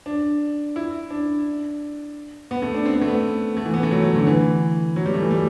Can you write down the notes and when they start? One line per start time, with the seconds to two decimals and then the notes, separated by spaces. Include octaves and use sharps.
0.06 D4
0.76 E4
1.11 D4
2.51 B3
2.62 A3
2.74 D4
2.85 C4
2.93 B3
3.01 A3
3.08 B3
3.57 A3
3.65 E3
3.74 B3
3.83 A3
3.91 F#3
4.02 F#3
4.15 D3
4.27 E3
4.96 F#3
5.06 G3
5.14 A3
5.23 E3
5.31 G3